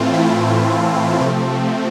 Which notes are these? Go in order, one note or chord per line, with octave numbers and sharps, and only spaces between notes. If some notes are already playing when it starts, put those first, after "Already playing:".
Already playing: A2 E3 A3 C4 F4
E4
C3 F3 A3 C4